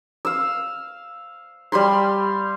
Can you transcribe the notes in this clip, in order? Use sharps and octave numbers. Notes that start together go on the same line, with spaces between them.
F5 E6
G3 F5 B5 C6